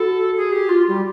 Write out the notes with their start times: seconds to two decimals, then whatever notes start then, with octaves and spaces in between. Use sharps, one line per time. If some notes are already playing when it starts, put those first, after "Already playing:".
Already playing: F#4 A4
0.37 G#4
0.52 G4
0.69 F4
0.88 G3